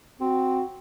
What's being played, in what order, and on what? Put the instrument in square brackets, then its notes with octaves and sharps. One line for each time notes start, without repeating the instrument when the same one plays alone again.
[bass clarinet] C4 [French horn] F#4